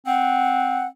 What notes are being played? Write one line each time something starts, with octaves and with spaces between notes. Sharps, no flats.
C4 F#5